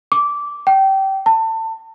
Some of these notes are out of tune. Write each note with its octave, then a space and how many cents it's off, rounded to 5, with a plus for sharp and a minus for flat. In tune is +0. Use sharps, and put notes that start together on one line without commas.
D6 -15
G5 -20
A5 +30